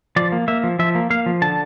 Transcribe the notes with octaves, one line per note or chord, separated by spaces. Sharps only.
F3 D5
A#3
A#3 E5
F3
F3 E5
A#3
A#3 F5
F3
D3 A5